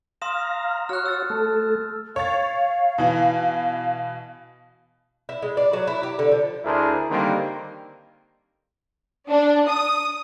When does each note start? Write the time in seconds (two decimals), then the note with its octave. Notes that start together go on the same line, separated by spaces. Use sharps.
0.22 F5 A#5 C6 D#6 E7
0.89 F#4 C#5 F6 F#6
1.06 E6 A6
1.30 A3 A4
2.16 C#5 F5 A6
2.98 B2 E3
5.29 E4
5.42 G#3
5.57 D5
5.73 F#3
5.87 E4
6.03 G4
6.19 D3
6.31 F3
6.65 D2 D4 E4 G#4 A#4 C5
7.10 D3 D#3 G3 A#3 C4 D#4
9.29 D4
9.67 D#6